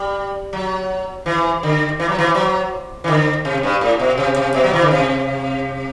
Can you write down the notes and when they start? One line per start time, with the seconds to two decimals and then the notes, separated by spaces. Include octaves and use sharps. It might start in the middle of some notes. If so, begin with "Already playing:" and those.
Already playing: G3
0.53 F#3
1.26 E3
1.63 D3
2.00 E3
2.09 F#3
2.18 E3
2.35 F#3
3.04 E3
3.08 D3
3.45 C3
3.63 G2
3.81 A2
3.99 B2
4.17 C3
4.36 C3
4.54 B2
4.64 F#3
4.74 E3
4.82 D3
4.91 C3